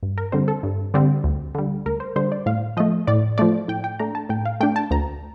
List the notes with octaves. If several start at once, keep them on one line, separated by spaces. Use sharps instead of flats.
G2
A#4
D3 G3 C4 C5
A4
G2
D3 G3 C4
D2
D3 G3
D2 A#4
C5
D3 G3 C5
D5
A2 F5
F3 A3 D#5
A2 D5
F3 A3 D5
A2 G5
G5
A3 D4 A#5
A5
A2 G5
F5
A3 D4 G5
A5
D2 A#5